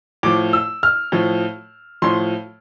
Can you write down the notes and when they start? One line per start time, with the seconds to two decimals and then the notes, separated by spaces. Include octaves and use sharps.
0.23 A2 F3 D6
0.53 E6
0.83 F6
1.12 A2 F3
2.02 A2 F3 C6